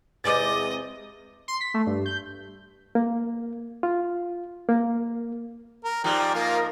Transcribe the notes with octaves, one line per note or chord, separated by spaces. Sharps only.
E2 C3 G#3 C4 D#5 D6 A6
C6
B6
A3
G2
G6
A#3
F4
A#3
A#4
G#2 F3 G4 D5 A#5
A#3 F4 A#4